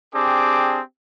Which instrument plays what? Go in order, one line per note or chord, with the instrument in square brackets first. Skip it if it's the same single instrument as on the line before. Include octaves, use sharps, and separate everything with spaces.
[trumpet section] C4 D4 G4 G#4 D6